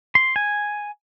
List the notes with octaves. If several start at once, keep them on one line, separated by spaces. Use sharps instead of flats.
C6
G#5